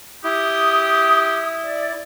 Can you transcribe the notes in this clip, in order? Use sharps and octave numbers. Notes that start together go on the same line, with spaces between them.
E4 G4 D#6
D5